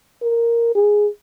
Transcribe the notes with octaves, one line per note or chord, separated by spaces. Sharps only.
A#4
G#4